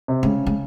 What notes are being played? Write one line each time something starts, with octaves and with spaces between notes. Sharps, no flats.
C3
C#3 G#3
G#3